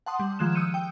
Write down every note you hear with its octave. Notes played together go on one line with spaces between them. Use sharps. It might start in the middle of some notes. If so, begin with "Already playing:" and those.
F#5 A5 C6 D#6
G3
D#3 F3 G#3 F#6 E7
D#6 E6 G6 C#7 D#7
G5